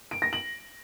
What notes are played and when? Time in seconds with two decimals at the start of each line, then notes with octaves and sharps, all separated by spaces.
0.11 D7
0.22 A#6
0.33 F#7